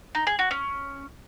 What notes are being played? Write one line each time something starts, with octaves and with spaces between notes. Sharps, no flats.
D#4
G#4
F#4
C#4